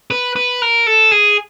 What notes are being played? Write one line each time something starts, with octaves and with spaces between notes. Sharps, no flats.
B4
B4
A#4
A4
G#4